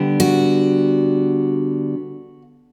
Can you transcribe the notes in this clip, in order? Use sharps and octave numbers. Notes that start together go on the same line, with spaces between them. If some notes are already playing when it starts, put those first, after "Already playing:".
Already playing: D3 G3 B3
F#4